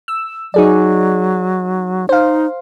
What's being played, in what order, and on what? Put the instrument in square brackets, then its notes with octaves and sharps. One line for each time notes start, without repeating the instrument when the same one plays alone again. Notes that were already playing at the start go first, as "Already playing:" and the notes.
[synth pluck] E6
[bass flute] F#3 [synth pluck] D#4 G#4 D5
[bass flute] D#4 [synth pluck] C5 F5